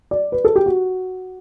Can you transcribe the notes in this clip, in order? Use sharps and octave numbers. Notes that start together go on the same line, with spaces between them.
D5
B4
A4
G4
F#4